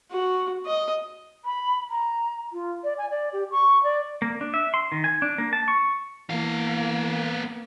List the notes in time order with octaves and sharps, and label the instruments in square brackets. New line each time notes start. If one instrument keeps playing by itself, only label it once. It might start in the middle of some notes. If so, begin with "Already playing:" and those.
[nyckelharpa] F#4
D#5
[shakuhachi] B5
A#5
F4
D5
G#5
D5
G4
C#6
D5
[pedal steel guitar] A#3
D4
E5
C6
D#3
G#5
D4
A#3
A5
C#6
[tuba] E3 [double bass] A#3 [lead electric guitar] B3 F5